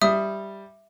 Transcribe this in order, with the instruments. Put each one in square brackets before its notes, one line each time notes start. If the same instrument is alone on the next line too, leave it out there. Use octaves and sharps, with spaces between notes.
[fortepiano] G3 [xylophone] E5 D#6